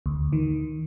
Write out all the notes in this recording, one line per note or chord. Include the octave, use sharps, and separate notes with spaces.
D2
D#3